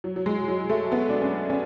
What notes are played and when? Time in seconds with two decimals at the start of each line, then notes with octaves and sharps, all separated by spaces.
0.04 F#3
0.16 F#3
0.26 G#3
0.48 F#3
0.70 A3
0.92 B3
1.09 D4
1.22 C#4
1.50 C#4